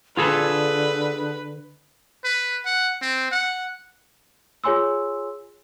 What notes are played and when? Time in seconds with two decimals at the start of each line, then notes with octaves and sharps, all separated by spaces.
0.17 D3 F4 G#4 A4 B4
2.24 B4
2.65 F#5
3.02 C4
3.31 F#5
4.64 F4 G#4 C#5 G#5 C6 E6